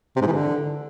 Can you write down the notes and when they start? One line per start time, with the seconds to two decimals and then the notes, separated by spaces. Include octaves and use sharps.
0.16 C3
0.22 G#2
0.27 E3
0.32 D3